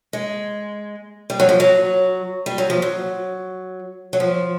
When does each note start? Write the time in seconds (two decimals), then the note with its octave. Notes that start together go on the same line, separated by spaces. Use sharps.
0.13 G#3
1.30 G3
1.40 F#3
1.49 F3
1.60 F#3
2.46 G3
2.58 F#3
2.70 F3
2.82 F#3
4.13 F#3
4.20 F3